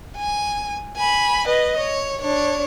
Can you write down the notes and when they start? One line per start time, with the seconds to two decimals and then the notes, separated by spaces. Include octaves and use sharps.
0.17 G#5
0.97 G#5 B5
1.48 B4 D#5
1.78 C#5
2.21 D4 C#5